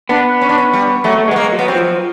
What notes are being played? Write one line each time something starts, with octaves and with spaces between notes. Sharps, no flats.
B3 D4
C#4
D4
C#4
G3
F#3 A3
A3
G#3 B3
A#3
F#3
B3
C4
F3